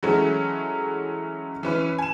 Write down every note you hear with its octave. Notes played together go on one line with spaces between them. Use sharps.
E3 F#3 G#3 A3 C#4
E3 C#4 B4
G#5 E7